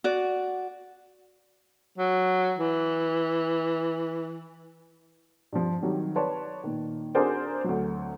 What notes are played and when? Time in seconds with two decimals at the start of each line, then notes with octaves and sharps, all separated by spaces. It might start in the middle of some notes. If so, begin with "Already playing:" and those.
0.04 F#4 D5
1.98 F#3
2.58 E3
5.53 G2 F3
5.82 D#3 F#3 G3
6.16 B4 C#5 D5 A5 C6
6.64 A#2 D#3
7.15 D4 F#4 G#4 A#4 C5 D5
7.64 D2 F#3